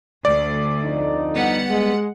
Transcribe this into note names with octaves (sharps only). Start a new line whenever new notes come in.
D2 D5
F2 D3 D#4
G3 B3 F#5
G#3